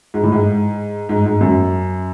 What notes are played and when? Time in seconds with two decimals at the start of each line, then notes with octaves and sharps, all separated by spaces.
0.14 G#2
0.23 A2
0.32 G#2
1.09 G#2
1.25 G#2
1.41 F#2